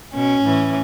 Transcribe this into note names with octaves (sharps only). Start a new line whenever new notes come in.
B2 C#4
A2 E3